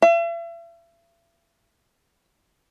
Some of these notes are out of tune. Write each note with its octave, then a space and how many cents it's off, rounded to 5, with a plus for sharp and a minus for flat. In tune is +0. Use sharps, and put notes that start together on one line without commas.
E5 +40